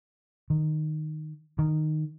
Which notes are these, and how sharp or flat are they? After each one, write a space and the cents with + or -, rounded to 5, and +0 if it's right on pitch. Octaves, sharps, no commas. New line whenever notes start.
D#3 -15
D#3 -10